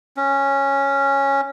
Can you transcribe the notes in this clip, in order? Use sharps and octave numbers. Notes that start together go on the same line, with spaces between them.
C#4